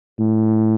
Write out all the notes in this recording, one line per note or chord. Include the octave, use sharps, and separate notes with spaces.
A2